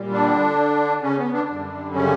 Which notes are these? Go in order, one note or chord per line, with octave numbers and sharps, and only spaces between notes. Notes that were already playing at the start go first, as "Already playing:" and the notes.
Already playing: A#2 G3
D3 D4
C#3 C#4
B3
D3 D4
F#2 D3 G3
C#3 C#4